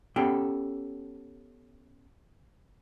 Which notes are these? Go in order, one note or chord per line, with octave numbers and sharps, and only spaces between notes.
B3 C#4 G4 A4 G5